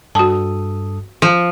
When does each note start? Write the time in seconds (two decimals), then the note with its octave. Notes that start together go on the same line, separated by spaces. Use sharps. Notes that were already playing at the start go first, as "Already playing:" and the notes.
0.15 G2 F#4 A4 A5 D#6
1.22 F3